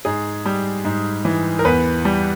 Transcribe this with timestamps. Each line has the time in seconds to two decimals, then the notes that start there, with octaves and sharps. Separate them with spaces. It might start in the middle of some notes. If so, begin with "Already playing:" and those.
0.05 G#2 G#4
0.45 G3
0.85 G#2
1.25 E3
1.59 A#4
1.65 E2 B4
2.05 G3